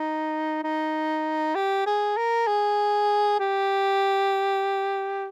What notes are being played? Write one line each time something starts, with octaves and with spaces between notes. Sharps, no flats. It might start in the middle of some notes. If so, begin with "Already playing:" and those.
Already playing: D#4
D#4
G4
G#4
A#4
G#4
G4